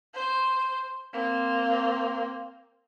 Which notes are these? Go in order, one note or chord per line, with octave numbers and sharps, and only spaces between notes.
C5
A#3 C4